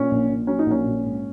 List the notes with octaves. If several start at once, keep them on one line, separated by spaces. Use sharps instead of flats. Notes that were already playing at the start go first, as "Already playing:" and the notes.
Already playing: A#2 C#4
A#1
A#2
F#3 C#4
D#4
A#1 C#4
A#2
G#2